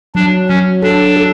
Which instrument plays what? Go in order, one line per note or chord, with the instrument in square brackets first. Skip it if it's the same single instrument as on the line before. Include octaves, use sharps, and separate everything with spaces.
[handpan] F#3 [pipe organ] D4
[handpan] F#3 [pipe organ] C#4
[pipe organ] D4 [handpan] A4
[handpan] A4